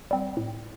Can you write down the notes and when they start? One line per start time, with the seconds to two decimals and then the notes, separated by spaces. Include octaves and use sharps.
0.11 G3 C4
0.37 A2